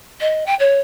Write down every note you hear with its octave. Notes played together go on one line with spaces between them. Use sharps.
D#5
G5
C#5